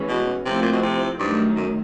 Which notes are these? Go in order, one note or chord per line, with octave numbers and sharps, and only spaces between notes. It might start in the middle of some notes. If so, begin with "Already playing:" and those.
Already playing: E3 G#3 C#4 F#4
B2
C3 F3 A3 C4 E4
A#2
B2
C3
G2 D#3 F#3 A3
F#2